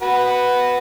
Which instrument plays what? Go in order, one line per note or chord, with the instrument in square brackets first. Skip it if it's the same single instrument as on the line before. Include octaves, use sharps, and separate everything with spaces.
[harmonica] F#4 B4